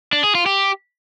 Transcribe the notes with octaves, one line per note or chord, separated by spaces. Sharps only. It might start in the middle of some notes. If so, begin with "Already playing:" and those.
D4
G#4
F4
G4